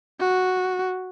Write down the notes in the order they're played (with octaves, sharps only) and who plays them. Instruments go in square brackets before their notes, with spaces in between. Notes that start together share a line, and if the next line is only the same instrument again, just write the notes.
[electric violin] F#4